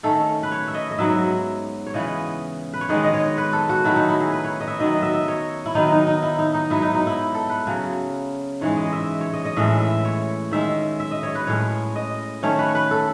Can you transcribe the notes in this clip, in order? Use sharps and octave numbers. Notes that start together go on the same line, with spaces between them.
D#3 A3 C#4 A4
B4
C#5
E5
D#5
D#5
G#2 F#3 B3 E5
C#5
C#3 E3 B3 D#5
B4
C#5
D#3 G#3 B3 D#5
D#5
C#5
B4
A4
F#4
D#3 F#3 A3 C#4 E4
D#4
E4
G#4
B4
C#5
D#5
E5
D#3 F#3 B3 D#5
E5
D#5
C#5
E4
D#3 F#3 B3 D#4
D#4
D#4
E4
D#4
D#4
G#2 F#3 B3 E4
D#4
D#4
E4
A4
B4
C#3 F#3 C#4
G#2 E3 G#3 C#5
D#5
E5
C#5
D#5
D#5
A2 E3 G#3 C#4 E5
E5
C#5
D#3 G#3 C#4 E5
E5
D#5
C#5
B4
A2 G#3 C#4 C#5
D#5
D#3 A3 C#4 C#5
B4
B4
A4